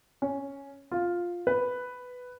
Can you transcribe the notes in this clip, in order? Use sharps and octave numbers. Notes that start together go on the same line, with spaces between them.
C#4
F4
B4